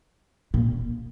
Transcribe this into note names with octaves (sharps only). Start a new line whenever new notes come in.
A#2